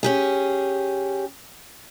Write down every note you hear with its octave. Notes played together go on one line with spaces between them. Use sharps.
C#4 G4 G#4